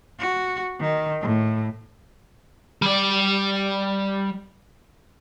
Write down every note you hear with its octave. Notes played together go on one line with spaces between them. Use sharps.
F#4
D#3
A2
G3 D5